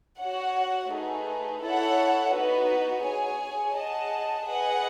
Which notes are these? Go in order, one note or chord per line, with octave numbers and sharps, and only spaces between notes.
F#4 C#5 F#5
A3 D#4 G#4 B4
E4 A4 C#5 F#5
B3 D#4 F#4 B4
G#4 C#5 G#5
G#4 D#5 F#5 A5
G#4 B4 D#5 F#5